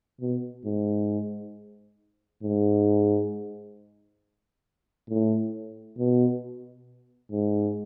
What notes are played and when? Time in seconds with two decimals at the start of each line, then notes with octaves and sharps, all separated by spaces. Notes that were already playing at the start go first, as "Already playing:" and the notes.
0.21 B2
0.65 G#2
2.43 G#2
5.10 A2
5.98 B2
7.31 G#2